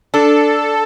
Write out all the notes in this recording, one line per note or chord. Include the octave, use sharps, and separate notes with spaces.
D4 A4